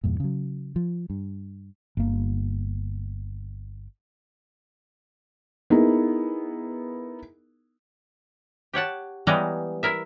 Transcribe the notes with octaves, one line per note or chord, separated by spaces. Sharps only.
E2 G2 A#2
C#3 F#3
F3
G2
G1 A#3
B3 D#4 E4 G#4 A#4
G4 C#5 F#5 A5
E3 G3 G#3 B3 C#5 A#5
E4 A#4 E5